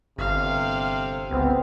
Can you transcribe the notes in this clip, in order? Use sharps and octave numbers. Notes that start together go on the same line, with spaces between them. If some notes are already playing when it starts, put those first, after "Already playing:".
G1 C3 F5
C#2 B3 C4